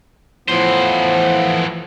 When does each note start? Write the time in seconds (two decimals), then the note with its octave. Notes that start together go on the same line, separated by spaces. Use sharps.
0.48 A2 E3 F3 B3 C5